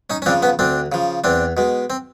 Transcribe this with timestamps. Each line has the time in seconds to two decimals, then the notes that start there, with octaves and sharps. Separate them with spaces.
0.10 C#4 D#4
0.22 C#4
0.26 C#3 F3 C4 D4
0.42 B3 C#4
0.59 D2 C4 D4
0.92 C#3 F3
1.24 E2 C4 D4
1.57 B2 G#3
1.90 C4